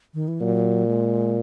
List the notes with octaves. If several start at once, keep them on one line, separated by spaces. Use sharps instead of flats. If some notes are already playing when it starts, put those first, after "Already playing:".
D#3
E3
A#2 F#3
G#3